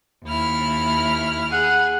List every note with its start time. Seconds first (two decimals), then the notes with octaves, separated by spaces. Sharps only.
0.25 D#2 E4 F6
1.52 G#4 F#5